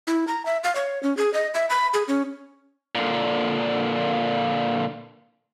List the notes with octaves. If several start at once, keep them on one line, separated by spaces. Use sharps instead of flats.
E4
A#5
E5
F5
C#5
C#4
G#4
D#5
E5
B5
G#4
C#4
A#2 D3